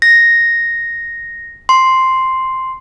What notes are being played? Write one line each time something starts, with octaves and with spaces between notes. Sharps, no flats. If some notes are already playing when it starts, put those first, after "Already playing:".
A#6
C6